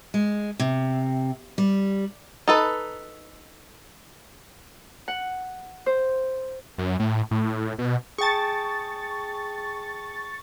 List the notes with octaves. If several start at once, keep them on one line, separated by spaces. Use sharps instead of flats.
G#3
C3
G3
D#4 A4 B4
F#5
C5
F#2
A2
A2
B2
G#4 G5 A5 C#6 A6